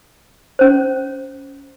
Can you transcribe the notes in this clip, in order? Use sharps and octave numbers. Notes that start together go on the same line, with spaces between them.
C#4 C5